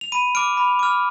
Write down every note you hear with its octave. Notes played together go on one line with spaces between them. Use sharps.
F7
B5 D#7
D6 F6 D7
B5
D6 F6